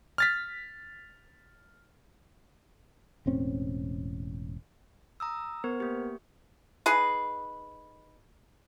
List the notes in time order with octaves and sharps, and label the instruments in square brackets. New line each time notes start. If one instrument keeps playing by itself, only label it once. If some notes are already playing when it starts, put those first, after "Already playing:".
[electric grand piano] F6 A6 B6
[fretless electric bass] E1 A2 C4 C#4
[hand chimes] A#5 D#6 E6
[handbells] B3 A#4 G#6 [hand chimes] C5
[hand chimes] A#3 G4
[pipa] D#4 G#4 B4